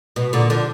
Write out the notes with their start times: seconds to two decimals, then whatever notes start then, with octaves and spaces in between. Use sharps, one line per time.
0.16 B2
0.33 A#2 D3
0.50 D3 F3